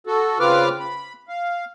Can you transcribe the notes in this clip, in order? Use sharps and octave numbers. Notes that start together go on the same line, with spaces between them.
F#4 A4
C#3 C4 F4 B4 D6 F6
B5
F5